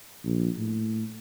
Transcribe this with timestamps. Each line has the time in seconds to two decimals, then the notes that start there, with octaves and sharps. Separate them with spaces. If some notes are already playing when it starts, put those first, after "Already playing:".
0.24 A#1
0.57 A2